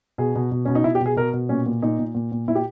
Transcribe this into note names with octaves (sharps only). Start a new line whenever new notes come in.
B2 G#4
B2
B2
B2 C#4
D#4
B2 E4
G4
B2
G#4
B2 A#4
B2
A#2 C#4
A#2
A#2 D#4
A#2
A#2
A#2
A#2 E4
G4